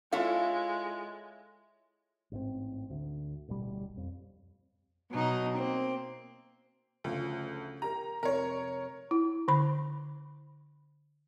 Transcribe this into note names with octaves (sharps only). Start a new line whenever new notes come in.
G#3 E4 F4 A4 C#5 F5
A1 G#2 C4
D2
D1 A1 B2 G3
F2
B2 F#3 D#4
A#3 C4
D2 C#3 F3
G4 A#4 A#5
F1 A#4 C#5
E4
D3 B5